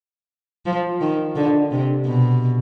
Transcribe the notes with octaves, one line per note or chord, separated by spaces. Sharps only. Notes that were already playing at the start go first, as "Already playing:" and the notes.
F3
D#3
D3
C3
B2